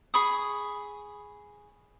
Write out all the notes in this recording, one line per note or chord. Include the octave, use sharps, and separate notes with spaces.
G#4 B5 C#6 D#6